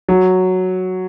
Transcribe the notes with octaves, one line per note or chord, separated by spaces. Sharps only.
F#3